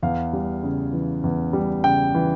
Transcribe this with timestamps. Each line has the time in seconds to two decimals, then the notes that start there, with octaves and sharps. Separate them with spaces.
0.03 E2 F5
0.33 G3
0.63 C#3
0.93 E3
1.24 E2
1.53 G3
1.84 C#3 G5
2.15 E3